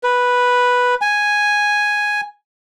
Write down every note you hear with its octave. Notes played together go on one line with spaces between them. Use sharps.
B4
G#5